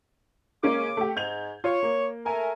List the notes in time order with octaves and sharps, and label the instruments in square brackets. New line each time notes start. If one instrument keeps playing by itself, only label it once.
[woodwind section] C#3 D6 [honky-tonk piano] G#3 A#3 C#4
[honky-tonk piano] A3 G4
[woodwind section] G#2 [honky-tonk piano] G6 G#6 F7
[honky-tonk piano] F4 [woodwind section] C#5
[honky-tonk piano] A#3
[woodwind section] A3 A#4 [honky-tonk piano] G#5